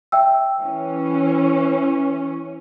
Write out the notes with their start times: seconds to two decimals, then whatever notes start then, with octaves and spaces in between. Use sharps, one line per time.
0.12 E5 G5 E6
0.61 E3 C#4